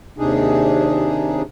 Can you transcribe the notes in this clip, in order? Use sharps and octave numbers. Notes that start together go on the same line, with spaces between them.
D#2 C3 D4 D#4 G#4